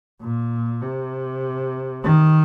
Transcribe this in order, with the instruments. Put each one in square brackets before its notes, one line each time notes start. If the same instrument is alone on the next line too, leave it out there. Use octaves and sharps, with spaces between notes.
[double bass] A#2
C3
D#3